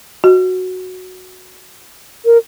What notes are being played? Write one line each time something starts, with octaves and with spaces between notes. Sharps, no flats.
F#4
A#4